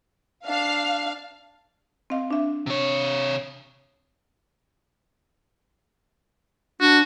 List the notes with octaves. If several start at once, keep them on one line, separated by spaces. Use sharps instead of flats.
D4 F5
C4 D#5 F5
D4 E5
C3 C#5
D4 F#4